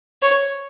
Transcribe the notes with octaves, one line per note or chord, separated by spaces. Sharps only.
C#5